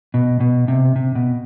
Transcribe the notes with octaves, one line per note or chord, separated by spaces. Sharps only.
B2
B2
C3
C3
B2